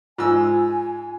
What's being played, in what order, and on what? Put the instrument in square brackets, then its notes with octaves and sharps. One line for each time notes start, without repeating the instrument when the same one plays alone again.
[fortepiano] G#2 E6 [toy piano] F4 [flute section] G#5